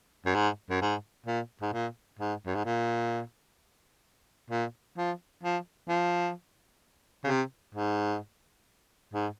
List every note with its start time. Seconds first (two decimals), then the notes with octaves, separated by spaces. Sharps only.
0.26 F#2
0.35 G#2
0.70 F#2
0.81 G#2
1.26 A#2
1.62 G#2
1.73 A#2
2.19 G#2
2.46 F#2
2.55 G#2
2.65 A#2
4.51 A#2
4.97 F3
5.43 F3
5.89 F3
7.24 C#3
7.27 C3
7.75 G#2
9.14 G#2